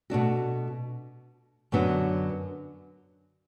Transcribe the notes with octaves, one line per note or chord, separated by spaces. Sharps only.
B2 A3 D4 F#4
F#2 D3 F#3 B3 D4